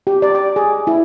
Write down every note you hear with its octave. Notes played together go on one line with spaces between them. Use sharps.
G4
D5
D6
G#4
E4